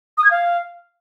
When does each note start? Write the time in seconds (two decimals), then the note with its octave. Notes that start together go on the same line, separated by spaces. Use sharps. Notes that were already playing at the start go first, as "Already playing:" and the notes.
0.18 D#6
0.24 G#6
0.31 F5